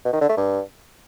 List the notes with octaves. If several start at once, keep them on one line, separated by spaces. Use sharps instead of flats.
B2
D#3
D3
A3
G2